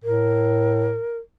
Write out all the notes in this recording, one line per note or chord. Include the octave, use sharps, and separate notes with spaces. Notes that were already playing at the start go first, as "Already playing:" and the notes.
A2 A#4